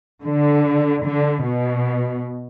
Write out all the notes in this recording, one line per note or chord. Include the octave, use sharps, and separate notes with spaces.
D3
D3
B2